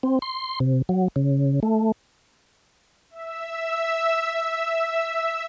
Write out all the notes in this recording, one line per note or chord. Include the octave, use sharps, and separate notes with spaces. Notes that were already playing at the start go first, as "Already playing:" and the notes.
C4
C6
C3
F#3
C#3
A3
E5 E6